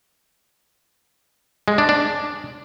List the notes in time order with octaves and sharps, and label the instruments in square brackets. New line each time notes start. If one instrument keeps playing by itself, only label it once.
[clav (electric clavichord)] G#3
D4
D4